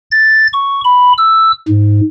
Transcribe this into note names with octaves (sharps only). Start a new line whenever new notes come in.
A6
C#6
B5
E6
G#2